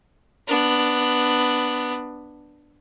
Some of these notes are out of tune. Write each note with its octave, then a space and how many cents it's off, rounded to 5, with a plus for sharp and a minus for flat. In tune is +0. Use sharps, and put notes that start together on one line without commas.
B3 +0 D4 +5